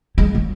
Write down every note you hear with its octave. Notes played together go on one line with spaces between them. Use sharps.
G#3
F#3